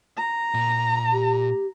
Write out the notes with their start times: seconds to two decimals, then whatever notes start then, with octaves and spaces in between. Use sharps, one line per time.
0.16 A#5
0.54 A#2
1.12 G4